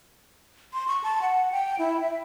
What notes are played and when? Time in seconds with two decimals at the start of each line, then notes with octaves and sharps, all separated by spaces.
0.73 C6
0.88 C#6
1.04 A5
1.21 F#5
1.52 G5
1.79 E4
2.01 E5